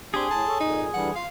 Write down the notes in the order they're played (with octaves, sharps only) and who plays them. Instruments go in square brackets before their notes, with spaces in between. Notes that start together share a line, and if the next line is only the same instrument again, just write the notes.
[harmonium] C4 D4 [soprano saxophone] G4 [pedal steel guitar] G#4 G#5 C6
[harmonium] A2 [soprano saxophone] A5
[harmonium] A4 C#5
[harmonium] F2 A#2 [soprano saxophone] D#4
[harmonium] D3 E3 G3 [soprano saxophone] F#5
[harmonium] F4 [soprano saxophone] F5